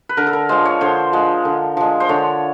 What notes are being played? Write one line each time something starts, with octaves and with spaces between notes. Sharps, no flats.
B4
D3 A#4
A4
A#4
F3 G#3 C5
C#5
D3 C5
F3 G#3
D3
F3 G#3
C5
D3 C#5